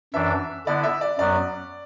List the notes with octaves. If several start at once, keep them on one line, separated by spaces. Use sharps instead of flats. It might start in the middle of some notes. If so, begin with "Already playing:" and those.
F#2 E3 D4 E5
D3 B3 E4 D5
E5
D5
F#2 F#3 B3 D5